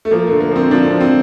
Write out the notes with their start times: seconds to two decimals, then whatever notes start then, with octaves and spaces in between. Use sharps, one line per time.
0.05 A3
0.11 F3 A#3
0.27 D3 A3
0.40 A#3
0.51 F3 C4
0.71 F3 D4
0.86 F3 C4
1.01 C4